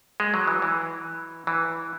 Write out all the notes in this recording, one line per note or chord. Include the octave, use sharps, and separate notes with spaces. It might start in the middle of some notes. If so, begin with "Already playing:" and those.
G#3
F#3
E3
E3
E3